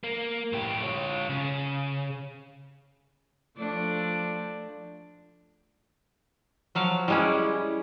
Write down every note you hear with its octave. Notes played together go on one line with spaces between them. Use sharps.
A#3
A2 G4
F4 C#5
C#3
F3 A3 D4
F3 F#3 F5
G3 G#3 C#4 E4